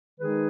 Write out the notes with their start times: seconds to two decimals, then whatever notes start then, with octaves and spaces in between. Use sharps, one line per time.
0.20 D#3 G#3 D#4 G#4 B4